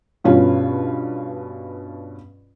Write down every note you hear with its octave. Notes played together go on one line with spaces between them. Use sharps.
G2 B2 C#4 F4